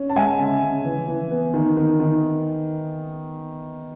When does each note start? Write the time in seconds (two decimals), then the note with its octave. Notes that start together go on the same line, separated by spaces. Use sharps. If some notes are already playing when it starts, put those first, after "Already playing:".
Already playing: C#4
0.09 A5
0.16 G#3 E5 G#5
0.39 C#3
0.62 C#3
0.85 E3
1.08 E3
1.31 B3
1.54 D#3
1.77 D#3
2.00 D#3